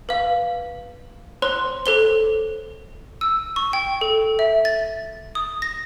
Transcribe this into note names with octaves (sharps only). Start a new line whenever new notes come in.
B4 F5
C5 C#5 C6
A4 C5 G7
E6
C#6
G5
A4
E5
A6
D#6
A#6